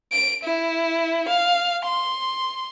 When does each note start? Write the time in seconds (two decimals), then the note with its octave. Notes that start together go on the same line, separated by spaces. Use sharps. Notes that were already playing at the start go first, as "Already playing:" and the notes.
0.12 D7
0.44 E4
1.28 F5
1.86 C6